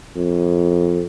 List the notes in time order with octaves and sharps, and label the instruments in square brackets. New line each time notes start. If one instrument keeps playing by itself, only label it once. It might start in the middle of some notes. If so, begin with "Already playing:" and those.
[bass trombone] F2